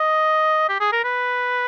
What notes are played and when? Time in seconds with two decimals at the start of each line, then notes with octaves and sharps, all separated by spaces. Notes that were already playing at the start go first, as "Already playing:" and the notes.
Already playing: D#5
0.69 G4
0.80 G#4
0.93 A#4
1.04 B4